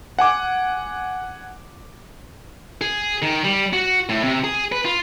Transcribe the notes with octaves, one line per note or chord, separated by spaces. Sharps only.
F#5 G#5 D6
G#4
D#3
G3
F#4
A2
C3
G#4
B4
F4